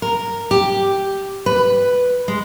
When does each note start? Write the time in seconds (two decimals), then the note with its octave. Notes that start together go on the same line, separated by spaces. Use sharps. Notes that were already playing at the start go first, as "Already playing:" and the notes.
0.02 A#4
0.51 G4
1.46 B4
2.28 G#3